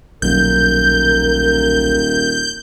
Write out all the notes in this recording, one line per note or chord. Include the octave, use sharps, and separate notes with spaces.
D#1 B1 A#4 G6